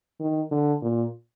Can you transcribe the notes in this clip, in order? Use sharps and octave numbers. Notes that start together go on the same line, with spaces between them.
D#3
D3
A#2